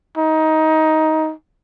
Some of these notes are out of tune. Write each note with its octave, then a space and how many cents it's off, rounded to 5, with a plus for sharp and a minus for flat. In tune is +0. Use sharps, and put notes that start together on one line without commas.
D#4 +15